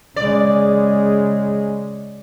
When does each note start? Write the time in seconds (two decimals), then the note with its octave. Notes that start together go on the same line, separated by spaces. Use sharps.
0.16 C#3 G#3 D5